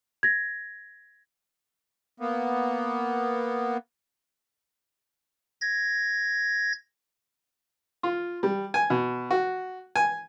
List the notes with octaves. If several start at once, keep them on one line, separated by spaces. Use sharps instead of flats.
G#6 A#6
A#3 B3
G#6 A#6
F4
G3
G#5
B2
F#4
G#5